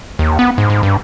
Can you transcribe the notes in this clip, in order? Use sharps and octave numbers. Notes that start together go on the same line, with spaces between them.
D#2
B3
G#2
G#2
G2